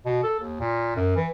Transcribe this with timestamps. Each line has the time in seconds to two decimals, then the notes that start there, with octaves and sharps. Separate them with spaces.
0.06 B2
0.24 A4
0.40 D#2
0.60 A#2
0.96 F#2
1.16 E3